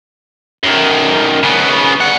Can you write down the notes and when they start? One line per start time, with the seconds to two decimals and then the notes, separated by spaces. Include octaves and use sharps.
0.63 F#2 D#3
1.43 C#3 B3
2.00 G2 F#5